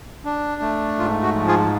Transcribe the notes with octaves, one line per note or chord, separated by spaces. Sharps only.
D4
A3
G#2 F4
F#4
F3
F4 G#4